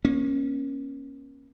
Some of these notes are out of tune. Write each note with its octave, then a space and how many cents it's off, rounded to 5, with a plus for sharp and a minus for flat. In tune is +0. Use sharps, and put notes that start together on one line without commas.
A#3 +35 C#4 -15